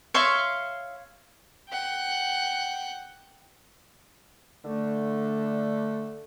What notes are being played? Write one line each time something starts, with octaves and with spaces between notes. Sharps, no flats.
C#5 E5 F5 C6
F#5 G5
D3 A3